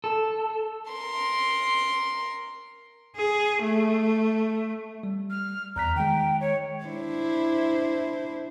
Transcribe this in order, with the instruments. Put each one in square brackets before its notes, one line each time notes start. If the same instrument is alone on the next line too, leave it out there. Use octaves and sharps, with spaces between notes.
[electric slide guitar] A4
[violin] A#4 C6
[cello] G#4
A3
[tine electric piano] G3
[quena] F6
[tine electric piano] E2 F#6 B6 [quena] A#5
[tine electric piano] D#3 G#3 [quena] G5
[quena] C#5
[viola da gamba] D4 E4 C5